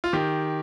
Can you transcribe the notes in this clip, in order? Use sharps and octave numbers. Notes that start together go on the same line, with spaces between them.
F4
D#3 G4